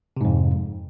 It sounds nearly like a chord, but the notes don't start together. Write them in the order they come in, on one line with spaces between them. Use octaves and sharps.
C3 G#2 F2